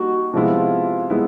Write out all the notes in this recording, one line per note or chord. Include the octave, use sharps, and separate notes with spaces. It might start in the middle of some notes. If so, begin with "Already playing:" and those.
Already playing: G3 A#3 D#4 F#4
C3 F3 G#3 B3 E4 F4
G#3 B3 E4